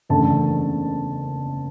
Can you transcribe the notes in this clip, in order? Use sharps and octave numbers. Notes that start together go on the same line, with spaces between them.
F#1 E2 D3 A3 A5